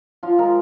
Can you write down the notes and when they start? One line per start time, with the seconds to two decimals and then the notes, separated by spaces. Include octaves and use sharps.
0.23 F3 F4
0.39 G#3 A#4